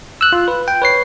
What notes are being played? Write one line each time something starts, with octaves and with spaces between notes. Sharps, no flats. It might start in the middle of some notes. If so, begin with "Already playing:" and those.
E6 F#6
F4
B4
G5
B4 C#5 C7